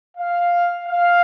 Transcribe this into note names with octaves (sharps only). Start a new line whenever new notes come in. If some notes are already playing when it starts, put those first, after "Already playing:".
F5
F5